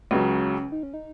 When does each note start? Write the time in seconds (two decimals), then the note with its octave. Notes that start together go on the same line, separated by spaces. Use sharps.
0.11 C#2 C#3 F#3 C#4
0.72 D#4
0.83 C#4
0.94 D#4